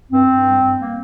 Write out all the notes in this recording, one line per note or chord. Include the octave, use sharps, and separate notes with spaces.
G2 C4
G2
G3
G2
A#3